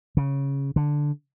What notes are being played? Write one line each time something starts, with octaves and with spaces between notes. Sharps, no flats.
C#3
D3